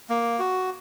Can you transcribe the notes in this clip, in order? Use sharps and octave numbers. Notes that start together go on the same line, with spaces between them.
A#3
F#4